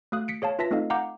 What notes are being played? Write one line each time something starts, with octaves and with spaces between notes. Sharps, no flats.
A3 F#4 F5 D#6 F#6
B6 C#7 D7
G#4 C#5 F5 A5
F4 B4 E5 A5 A#6 B6
A3 C4 D#4 A4 D#5 F5
F5 F#5 A#5 D6 G6